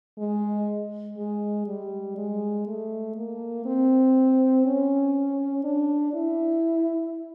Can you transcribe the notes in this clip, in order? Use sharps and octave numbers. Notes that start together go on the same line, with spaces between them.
G#3
G#3
G3
G#3
A3
A#3
C4
C#4
D4
E4